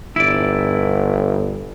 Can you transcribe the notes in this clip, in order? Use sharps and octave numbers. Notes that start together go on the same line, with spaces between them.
G1 E4 D5